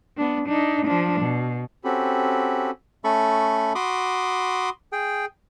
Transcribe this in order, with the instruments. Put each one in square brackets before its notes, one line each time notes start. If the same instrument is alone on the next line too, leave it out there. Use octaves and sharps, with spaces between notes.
[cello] B3 D4
D4 D#4
F3 D4
B2
[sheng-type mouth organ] C4 C#4 F#4 G4 A4 B5
[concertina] A3 C#4 A4 B5 C#6
F#4 B5 C6 D6 D#6
G#4 G5